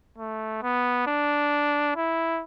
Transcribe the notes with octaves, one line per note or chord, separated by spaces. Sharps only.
A3
B3
D4
E4